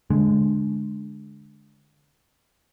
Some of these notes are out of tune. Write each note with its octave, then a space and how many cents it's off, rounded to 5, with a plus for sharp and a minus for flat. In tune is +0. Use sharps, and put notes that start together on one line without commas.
D3 -5 G#3 +15